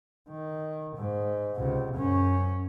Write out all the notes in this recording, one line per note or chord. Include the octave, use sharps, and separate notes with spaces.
D#3
G#2
C#2 C3
F#2 C#4